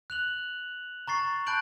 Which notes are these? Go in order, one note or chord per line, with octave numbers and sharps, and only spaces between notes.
F#6 F7 F#7
A#5 C#6 A6 C7
A5 B5 F#6 G6 D7 F#7